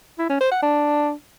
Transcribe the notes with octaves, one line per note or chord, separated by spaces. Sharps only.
E4
C#4
C5
F#5
D4